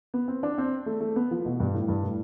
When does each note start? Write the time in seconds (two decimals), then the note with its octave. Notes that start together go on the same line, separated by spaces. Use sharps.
0.14 B3
0.28 C4
0.43 D4
0.58 C4
0.86 A3
1.01 A3
1.16 B3
1.31 F3
1.45 B2
1.60 G2
1.74 A2
1.88 G2
2.04 A2